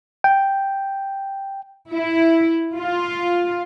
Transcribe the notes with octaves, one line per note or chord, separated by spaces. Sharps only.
G5
E4
F4